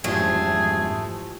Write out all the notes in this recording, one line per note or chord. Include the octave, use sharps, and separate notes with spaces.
F2 G#2 E3 F3 A3 G4 G#4